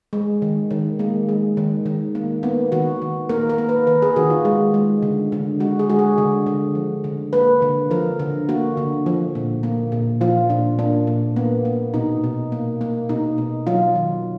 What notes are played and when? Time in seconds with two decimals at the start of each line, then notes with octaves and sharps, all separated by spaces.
0.13 G#3
0.42 D#3
0.71 D#3
0.99 G#3 A#3
1.29 G#3
1.57 D#3
1.86 D#3
2.15 A#3
2.43 A#3 B3
2.72 D#3 F#4
3.02 D#3
3.29 A#3 A#4
3.50 A#4
3.58 A#3
3.69 B4
3.87 D#3 B4
4.02 G#4
4.16 D#3 F#4
4.30 F4
4.45 G#3
4.74 G#3
5.02 D3
5.32 D3
5.60 G#3 F#4
5.79 G#4
5.90 G#3 F#4
5.99 G#4
6.18 D3
6.46 D3
6.75 F3
7.04 D3
7.33 A#3 B4
7.62 D3
7.91 F3 A#4
8.19 D3
8.49 A#3 F#4
8.77 D3
9.06 F3
9.35 A#2
9.63 A#3
9.92 A#2
10.21 F3 F4
10.50 A#2 D4
10.79 A#3 D4
11.07 A#2
11.36 A#3 B3
11.65 A#3
11.94 B2 D#4
12.24 B2
12.52 A#3
12.81 A#3
13.09 B2 D#4
13.38 B2
13.67 F#3 F4
13.95 D#3